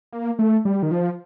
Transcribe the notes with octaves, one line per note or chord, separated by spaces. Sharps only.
A#3
A3
G3
D#3
F3